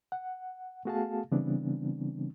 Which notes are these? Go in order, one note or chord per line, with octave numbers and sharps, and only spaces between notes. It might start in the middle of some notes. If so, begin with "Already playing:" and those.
F#5
A3 B3 F#4 G#4 F5 A5
C#3 E3 G3 B3 C4 D4